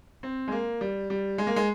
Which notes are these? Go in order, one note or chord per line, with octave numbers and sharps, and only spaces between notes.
C4
G#3
A#3
G3
G3
G#3
A#3
G#3